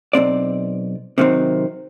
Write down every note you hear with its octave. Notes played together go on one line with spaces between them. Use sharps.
B1 G2 C4 D5
C3 D#3 F#3 C4